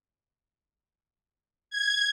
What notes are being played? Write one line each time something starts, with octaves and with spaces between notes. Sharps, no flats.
G#6